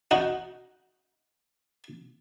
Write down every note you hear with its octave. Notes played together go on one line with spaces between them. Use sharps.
D#4 F#4